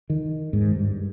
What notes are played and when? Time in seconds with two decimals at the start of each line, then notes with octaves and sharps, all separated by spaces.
0.10 D#3
0.53 G#2
0.76 G2